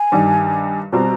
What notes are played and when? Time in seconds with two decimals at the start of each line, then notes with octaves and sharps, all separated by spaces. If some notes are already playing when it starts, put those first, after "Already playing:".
Already playing: G#5
0.12 G2 D#3 G3
0.92 B2 G3 C4 F4 A#5